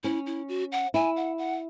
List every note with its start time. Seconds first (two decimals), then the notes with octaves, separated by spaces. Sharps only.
0.04 C#4 E4
0.26 E4
0.48 F#4
0.72 F#5
0.94 E4 G#5
1.16 F#5
1.38 F#5